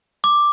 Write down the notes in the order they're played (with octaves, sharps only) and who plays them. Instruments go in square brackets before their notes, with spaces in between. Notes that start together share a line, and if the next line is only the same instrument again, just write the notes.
[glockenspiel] D6